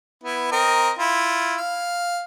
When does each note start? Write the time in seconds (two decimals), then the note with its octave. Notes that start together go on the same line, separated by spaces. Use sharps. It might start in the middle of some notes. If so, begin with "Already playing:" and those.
0.23 B3 E4
0.52 C4 A#4 D#5
0.99 E4 F4
1.58 F5